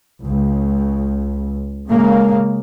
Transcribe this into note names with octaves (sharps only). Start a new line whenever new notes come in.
C#2
C#3 G#3 A#3